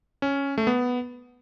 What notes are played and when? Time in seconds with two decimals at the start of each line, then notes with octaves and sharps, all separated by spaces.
0.22 C#4
0.58 A3
0.67 B3